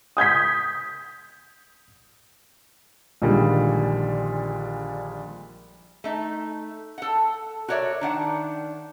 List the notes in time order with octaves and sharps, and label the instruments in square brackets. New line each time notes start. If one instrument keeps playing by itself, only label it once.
[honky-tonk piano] D#6 G6 G#6 B6
[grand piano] A#1 A#2 D3 D#3 G3 G#3
[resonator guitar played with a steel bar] A3 D#4
A4 F#5
F#4 A#4 C#5 D5 E5
D#3 D4 F#5